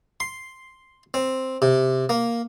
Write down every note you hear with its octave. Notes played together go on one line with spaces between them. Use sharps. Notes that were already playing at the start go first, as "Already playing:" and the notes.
C6
C4
C3
A#3